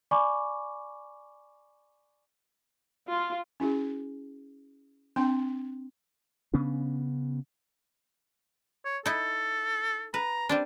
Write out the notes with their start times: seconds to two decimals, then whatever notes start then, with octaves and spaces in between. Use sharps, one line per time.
0.11 D5 G#5 B5 C#6 D6
3.10 F4
3.60 C#4 E4 F#4 G#4
5.16 C4 D4 G5 C6
6.54 C#3 B3 C#4 D4
8.85 C#5
9.06 D#4 E4 A4
10.14 B4 A#5
10.49 G3 C4 D4